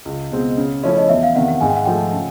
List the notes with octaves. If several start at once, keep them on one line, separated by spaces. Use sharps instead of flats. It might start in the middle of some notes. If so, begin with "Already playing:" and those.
C#2
B2 G#3 C4
C#3
F3 A3 C#4 E4
D#5
E2 E5
F5
C3 D#3 F#5
F#5
G#2 G#5
G5
F#5
F3 A3 G5
C#3